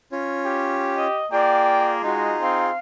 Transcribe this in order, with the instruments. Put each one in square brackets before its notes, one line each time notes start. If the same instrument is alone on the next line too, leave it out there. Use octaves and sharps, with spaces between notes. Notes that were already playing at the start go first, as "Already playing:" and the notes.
[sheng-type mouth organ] C#4 F4 C#5
[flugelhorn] G4
[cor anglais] D#5
[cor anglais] A#3 [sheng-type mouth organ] F4 G#4 [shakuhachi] D5 [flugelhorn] G5
[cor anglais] G#3 [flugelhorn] D#4 [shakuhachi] F#4
[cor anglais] C4 [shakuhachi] F5